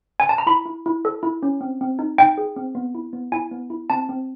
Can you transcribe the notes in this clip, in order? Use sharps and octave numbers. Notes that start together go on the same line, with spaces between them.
G#5
A5
A#5
E4 B5
E4
E4
A4
E4
C#4
C4
C4
D#4
D#4 G5
G#4
C4
B3
E4
B3
E4 G#5
B3
E4
C4 A5
C4